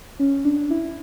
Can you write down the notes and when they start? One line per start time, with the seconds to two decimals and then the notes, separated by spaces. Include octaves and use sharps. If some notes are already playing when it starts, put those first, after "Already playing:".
0.19 C#4
0.45 D4
0.71 E4